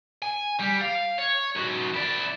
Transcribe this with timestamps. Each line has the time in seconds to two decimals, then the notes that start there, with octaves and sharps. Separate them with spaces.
0.22 G#5
0.60 G3
0.81 F5
1.18 C#5
1.56 D#3 F#4
1.94 E4 D5